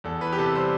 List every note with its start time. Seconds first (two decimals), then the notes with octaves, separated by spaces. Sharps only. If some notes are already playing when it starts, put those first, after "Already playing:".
0.04 E2 A4
0.21 E3 B4
0.33 G4
0.39 C3 A4
0.55 G3 C5